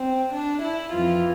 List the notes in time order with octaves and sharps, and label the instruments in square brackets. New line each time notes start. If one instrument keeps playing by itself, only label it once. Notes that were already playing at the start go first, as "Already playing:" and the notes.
Already playing: [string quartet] C4
D4
E4
F2 E3 F4